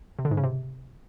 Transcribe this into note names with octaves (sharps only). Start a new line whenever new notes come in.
C3
D3
G#2
C#3
C3